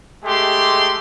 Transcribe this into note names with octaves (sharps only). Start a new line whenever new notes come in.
G#3 A3 G4 C6